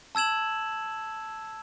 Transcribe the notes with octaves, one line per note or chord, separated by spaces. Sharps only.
A5 E6 G#6 E7 F#7